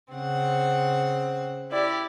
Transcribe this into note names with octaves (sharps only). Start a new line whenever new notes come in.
C#3 C4 F#5
E4 G4 D5